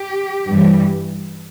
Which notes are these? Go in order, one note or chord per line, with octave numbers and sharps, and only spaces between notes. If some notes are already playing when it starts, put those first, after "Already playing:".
Already playing: G4
G2 E3 G3